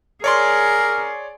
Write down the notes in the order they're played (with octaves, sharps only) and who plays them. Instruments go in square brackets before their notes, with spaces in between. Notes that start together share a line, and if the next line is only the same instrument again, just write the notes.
[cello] G#4 [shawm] A#4 [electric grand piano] C#5 D5 C6